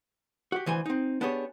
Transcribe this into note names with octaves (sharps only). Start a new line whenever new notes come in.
F#4 G4
D2 E3 C5 G#5
C4 D#4
B3 D4 G4 G#4 C#5